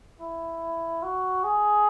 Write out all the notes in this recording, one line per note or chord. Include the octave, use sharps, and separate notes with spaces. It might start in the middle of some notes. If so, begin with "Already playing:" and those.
E4
F#4
G#4